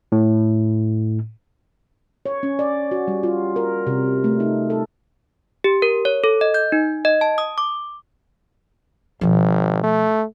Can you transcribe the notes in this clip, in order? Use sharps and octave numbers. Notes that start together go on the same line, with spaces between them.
A2
C#5
C#4
D5
F#4
G3
F4
A#4
C3
A3
D#4
A4
G4
A#4
C#5
A4
D#5
G6
D#4
D#5
A5
D#6
D6
G#1 B2 F3
A3